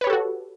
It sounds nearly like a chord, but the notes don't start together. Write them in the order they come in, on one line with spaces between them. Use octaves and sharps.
B4 C#5 G4 A4 F#4